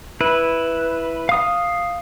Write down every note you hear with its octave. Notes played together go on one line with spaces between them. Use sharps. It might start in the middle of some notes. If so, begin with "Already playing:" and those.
E4 B4
F5 D#6